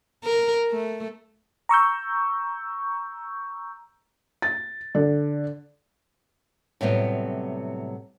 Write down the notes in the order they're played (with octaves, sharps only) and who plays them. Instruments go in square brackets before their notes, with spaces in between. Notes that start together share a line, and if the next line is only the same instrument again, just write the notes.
[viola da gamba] A#4
A3
[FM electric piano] A#5 C#6 E6 G6
[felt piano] A6
D3
[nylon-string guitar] A2 C3 F#3 G3 B3